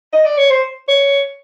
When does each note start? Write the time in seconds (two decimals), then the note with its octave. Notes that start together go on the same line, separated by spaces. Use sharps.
0.13 D#5
0.25 D5
0.37 C#5
0.50 C5
0.88 C#5